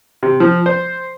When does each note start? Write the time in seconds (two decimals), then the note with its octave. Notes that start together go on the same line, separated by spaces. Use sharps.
0.23 C3
0.40 F3
0.66 C5